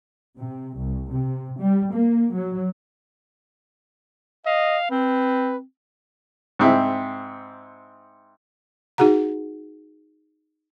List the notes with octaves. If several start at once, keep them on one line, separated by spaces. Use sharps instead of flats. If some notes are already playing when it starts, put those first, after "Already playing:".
C3
C2
C3
G3
A#3
F#3
D#5 F5
C4 B4
G#2 C4 E4
D#4 F#4 G#4 F#5 A#5